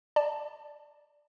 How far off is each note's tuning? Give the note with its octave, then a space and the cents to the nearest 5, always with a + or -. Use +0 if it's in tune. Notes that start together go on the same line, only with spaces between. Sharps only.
D5 +0 A5 +0